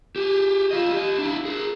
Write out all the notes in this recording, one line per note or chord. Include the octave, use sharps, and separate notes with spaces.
G4 G#4
F4 D#5
G4 D#5
D4 E4
G#4 A#4